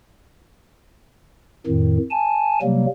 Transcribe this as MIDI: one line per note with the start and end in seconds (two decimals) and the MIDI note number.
1.67 1.98 41
1.67 1.98 45
1.67 1.98 51
2.11 2.59 80
2.11 2.59 81
2.62 2.86 48
2.62 2.86 54
2.62 2.86 55
2.62 2.86 58